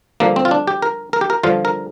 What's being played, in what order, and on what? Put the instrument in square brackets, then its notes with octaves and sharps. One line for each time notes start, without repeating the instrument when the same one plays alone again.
[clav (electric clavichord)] G2 D3 F3 A#3
C4
F4
D4
G4
A#4
A#4
G4
A#4
G2 D3 F3 F4
A#4